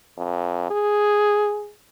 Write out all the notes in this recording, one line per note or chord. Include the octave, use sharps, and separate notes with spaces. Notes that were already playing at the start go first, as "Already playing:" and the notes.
F2
G#4